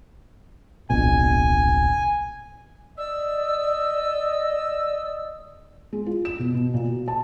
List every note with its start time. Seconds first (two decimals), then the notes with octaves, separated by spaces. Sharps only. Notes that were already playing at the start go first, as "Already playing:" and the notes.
0.90 D1 A#1 B2 G#5
2.98 D5 D#5 E6
5.93 G#3
6.06 F4
6.25 E7
6.39 B2
6.54 B2
6.74 A#2
6.86 F#4
7.08 A5